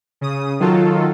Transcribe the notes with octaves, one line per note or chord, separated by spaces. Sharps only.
C#3 D#6
D#3 F#3 F4 A4